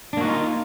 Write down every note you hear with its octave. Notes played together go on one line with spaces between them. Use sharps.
A#3 D4 D#4 F4 F#4